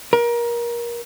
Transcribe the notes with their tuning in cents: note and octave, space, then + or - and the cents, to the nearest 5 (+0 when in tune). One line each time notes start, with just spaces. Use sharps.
A#4 +25